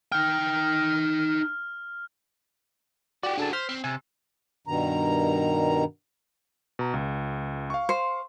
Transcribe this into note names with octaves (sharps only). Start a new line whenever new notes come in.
D#4 G5 F6
F#4 G4 D5
D4 F#4 G#4 A4 A5
C5 F6 B6
C4
C3 G#5
G2 B2 D#3 A#5
B2 A#5
C#2
F5 C#6
C5